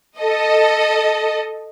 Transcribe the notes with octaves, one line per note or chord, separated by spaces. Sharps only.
A4 D#5